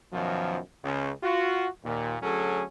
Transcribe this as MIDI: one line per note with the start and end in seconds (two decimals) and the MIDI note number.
0.13 0.58 42
0.13 0.58 47
0.13 0.58 51
0.13 0.58 53
0.84 1.11 37
0.84 1.11 49
1.23 1.68 65
1.23 1.68 66
1.85 2.16 39
1.85 2.16 46
2.22 2.63 38
2.22 2.63 54
2.22 2.63 61
2.22 2.63 68
2.22 2.63 69